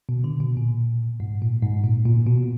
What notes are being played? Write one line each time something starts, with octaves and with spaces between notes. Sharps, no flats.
B2
D3
B2
A#2
G#2
A#2
G#2
A#2
A#2
B2